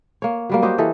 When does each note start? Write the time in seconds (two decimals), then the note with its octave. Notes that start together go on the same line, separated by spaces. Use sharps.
0.22 A#3 C#5
0.50 F#3 G3 A#3
0.62 F#4 G4 C5 D#5
0.78 E3 A4 D#5